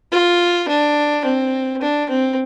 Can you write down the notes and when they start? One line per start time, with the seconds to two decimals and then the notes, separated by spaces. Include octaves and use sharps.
0.12 F4
0.68 D4
1.25 C4
1.82 D4
2.09 C4